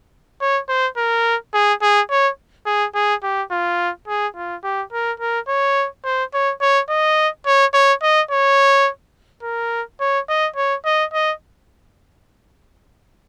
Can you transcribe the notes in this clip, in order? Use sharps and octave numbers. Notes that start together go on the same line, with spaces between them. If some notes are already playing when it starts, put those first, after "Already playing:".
C#5
C5
A#4
G#4
G#4
C#5
G#4
G#4
G4
F4
G#4
F4
G4
A#4
A#4
C#5
C5
C#5
C#5
D#5
C#5
C#5
D#5
C#5
A#4
C#5
D#5
C#5
D#5
D#5